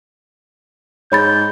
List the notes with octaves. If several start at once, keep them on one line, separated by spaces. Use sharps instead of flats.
G#2 C#5 B5 G6 A6